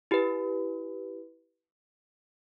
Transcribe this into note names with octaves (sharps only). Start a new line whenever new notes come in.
E4 G4 B4